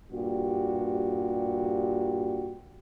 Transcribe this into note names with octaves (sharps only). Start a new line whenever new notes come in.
G2 A#2 F#4 G4